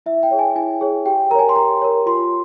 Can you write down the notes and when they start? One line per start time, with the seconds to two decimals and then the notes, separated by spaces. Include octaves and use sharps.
0.06 E4 E5
0.23 G5
0.31 G#4 C#5
0.39 G#5
0.56 E4 G#5
0.81 G#4 C#5
1.06 G4 G5
1.31 A#4 A#5
1.35 C#5 G#5
1.49 C6
1.56 G4 A#5
1.82 A#4 C#5
2.06 F4 C6